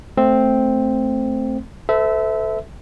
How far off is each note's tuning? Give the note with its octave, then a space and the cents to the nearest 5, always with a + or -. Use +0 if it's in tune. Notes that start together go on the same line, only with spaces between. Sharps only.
A3 +0 C4 +0
A4 +0 C5 -45 E5 -15